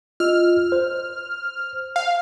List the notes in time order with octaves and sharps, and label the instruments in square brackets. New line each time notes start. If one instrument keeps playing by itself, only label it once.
[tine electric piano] F4 D#5 E6 [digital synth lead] F6
[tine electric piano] C5
[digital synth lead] F5